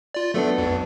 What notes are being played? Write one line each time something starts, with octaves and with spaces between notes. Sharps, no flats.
F4 D5
F#3 A3 B3 D4 A4
B1 F2